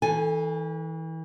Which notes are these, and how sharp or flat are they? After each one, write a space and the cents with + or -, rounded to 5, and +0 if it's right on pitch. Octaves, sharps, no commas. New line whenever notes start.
E3 -30 A4 +0 G#5 +0